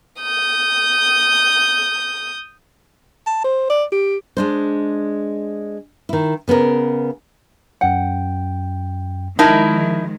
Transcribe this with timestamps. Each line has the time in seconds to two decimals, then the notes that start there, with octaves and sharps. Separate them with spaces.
0.22 D#6 G6
3.26 A5
3.44 C5
3.70 D5
3.92 G4
4.37 G#3 D4 C5
6.09 D#3 E4
6.48 C#3 B3 C#4 A#4
7.81 F#2 F#5 G5
9.39 D#3 F3 G#3 D#4 E4 A#4 A5